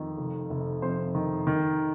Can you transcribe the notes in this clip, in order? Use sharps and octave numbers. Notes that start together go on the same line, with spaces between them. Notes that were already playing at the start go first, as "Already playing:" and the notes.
Already playing: F2 D#3
F1
F1
F2 C5
D#3
D#3